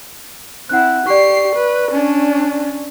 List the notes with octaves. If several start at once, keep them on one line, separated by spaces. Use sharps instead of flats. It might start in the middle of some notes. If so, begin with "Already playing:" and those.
C4 E4 F#5 F#6
G4 D5 C#6 C7
B4
C#4 D4